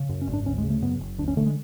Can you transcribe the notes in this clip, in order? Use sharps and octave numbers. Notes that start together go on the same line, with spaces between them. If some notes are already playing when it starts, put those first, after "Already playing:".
Already playing: C#3
F#2
C#4
G#1
D4
D2 C#4
G#3
C#3
A3
F#2 B3
F#1
D2 D4
C#4
D3 A3
G#3